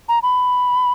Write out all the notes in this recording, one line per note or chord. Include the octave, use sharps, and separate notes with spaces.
A#5
B5